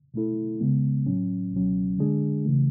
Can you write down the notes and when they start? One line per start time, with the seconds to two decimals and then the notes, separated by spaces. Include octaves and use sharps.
0.14 B2 A3 E4 A4
0.60 C#3 G#3 B3
1.06 A2 F#3 C#4
1.52 C#2 B2 F#3 C#4
1.99 D3 G#3 D4 G#4
2.45 C#3 E3 A3